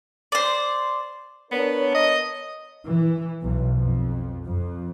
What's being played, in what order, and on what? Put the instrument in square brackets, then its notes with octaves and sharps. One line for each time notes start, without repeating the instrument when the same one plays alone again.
[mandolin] C5 D5
[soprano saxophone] B3 [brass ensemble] D4 A#4 C#5
[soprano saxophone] D#5
[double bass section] E3
B1
F2
F2